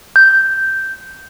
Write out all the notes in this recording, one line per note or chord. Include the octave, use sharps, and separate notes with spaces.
G6